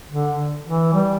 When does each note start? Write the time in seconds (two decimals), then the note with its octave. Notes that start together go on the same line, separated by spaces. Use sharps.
0.10 D3
0.66 E3
0.93 G3